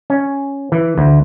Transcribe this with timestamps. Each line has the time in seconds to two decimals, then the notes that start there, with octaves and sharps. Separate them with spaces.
0.10 C#4
0.72 E3
0.98 D2